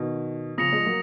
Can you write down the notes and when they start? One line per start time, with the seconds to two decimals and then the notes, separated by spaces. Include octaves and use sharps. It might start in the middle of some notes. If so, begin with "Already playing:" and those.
Already playing: B2 D#3
0.58 C#3 F3 D#6 A#6 C#7 F7
0.72 F3 G#3
0.86 F#3 A#3